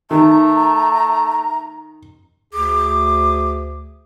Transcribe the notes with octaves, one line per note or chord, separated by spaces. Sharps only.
D#3 A3 A#5
D2 G#4 D6